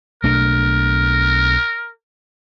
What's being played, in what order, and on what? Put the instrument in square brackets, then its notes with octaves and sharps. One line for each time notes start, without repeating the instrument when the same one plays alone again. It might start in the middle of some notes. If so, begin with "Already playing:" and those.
[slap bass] B1 A3 D4 [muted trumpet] A#4